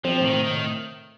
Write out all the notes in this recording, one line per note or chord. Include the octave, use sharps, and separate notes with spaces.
F3 C4
A2 D#3
A2
D#3
A2